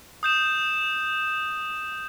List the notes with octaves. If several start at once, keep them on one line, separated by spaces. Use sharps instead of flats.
D#6 G6 E7